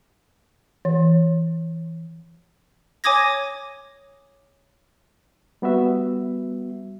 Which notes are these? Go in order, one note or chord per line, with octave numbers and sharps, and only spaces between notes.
E3
C#5 G#5 D6 D#6 G#6 A#6
G3 B3 F#4 E5